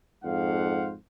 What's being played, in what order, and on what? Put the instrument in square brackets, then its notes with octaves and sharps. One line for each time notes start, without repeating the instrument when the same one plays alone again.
[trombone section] F2 G#2 [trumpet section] C5 F5 F#5